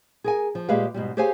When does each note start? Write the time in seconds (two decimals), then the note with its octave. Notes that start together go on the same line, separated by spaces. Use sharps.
0.24 G#4 A#4 G#5
0.55 F3
0.69 A#2 G#3 G4 G#4 B4 F5
0.94 G#2 B2 G3
1.17 G4 G#4 C5 C#5 F5 G#5